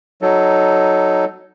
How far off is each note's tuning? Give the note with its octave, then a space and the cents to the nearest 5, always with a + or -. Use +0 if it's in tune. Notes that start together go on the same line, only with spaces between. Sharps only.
F#3 +5 D#4 +0 A4 +0